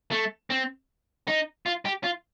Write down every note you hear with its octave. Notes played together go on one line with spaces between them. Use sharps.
A3
C4
D#4
F4
G4
F4